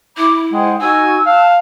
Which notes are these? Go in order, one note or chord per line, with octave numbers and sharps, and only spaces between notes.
E4 E5 B5 D6
G#3 C5 F#5 G5
D#4 F#4 G#5 E6
F5 A5 F#6